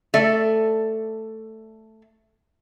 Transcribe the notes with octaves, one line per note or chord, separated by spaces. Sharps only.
A3 A4 D5 E5